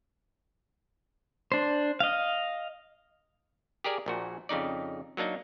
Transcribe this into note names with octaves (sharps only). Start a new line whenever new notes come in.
D4 C5
D#5 F5
G4 G#4 A#4 D5 G#5
A#1 A#2 F#4
F2 C#3 D#4 D5
F#3 A#3 D4 D#4